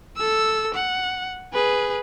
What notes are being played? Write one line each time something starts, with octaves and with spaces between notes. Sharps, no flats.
A4 E6
F#5
G#4 B4